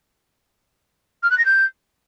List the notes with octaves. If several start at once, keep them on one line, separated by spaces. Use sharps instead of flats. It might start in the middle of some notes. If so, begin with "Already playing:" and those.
F6
F#6
A#6
G6